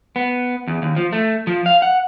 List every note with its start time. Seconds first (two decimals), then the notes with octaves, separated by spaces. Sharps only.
0.16 B3
0.68 E2
0.82 D#2
0.96 F3
1.13 A3
1.47 F3
1.66 F5
1.82 F#5